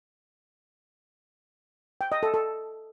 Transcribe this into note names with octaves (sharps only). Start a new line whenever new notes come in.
G5
D#5
A4
A4